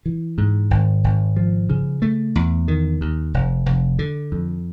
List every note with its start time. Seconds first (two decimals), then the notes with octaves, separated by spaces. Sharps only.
0.06 E3
0.38 G#2
0.71 G#1
1.04 G#1
1.36 F3
1.69 C#3
2.02 A3
2.35 E2
2.68 D#3
3.01 D#2
3.34 F1
3.66 F1
3.99 D3
4.32 F2